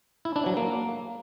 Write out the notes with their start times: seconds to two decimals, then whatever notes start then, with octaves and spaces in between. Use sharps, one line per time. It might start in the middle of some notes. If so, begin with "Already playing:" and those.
0.25 E4
0.36 D4
0.46 F#3
0.57 A#3